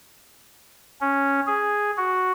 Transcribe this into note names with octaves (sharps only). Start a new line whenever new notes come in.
C#4
G#4
F#4